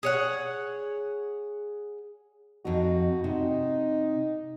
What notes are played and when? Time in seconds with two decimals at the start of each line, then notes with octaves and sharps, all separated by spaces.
0.03 G#4 C#5 F#5
2.65 F2 D#4 F#4
3.24 C3 D#4